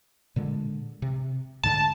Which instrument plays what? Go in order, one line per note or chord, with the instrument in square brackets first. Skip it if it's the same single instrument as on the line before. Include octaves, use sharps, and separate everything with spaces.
[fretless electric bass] A#2 D3 G#3
C3
[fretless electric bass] D2 G#2 D3 [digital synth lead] A5